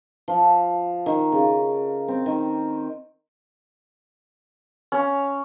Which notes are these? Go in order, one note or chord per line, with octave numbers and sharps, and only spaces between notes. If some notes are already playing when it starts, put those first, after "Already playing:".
F3
D#3
C#3
C4
D#3
C#4